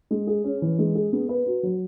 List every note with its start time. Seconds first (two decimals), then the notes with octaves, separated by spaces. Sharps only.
0.11 G#3
0.27 G#4
0.44 C#4
0.62 E3
0.79 G#3
0.95 G#4
1.13 B3
1.29 B4
1.46 F#4
1.63 F#3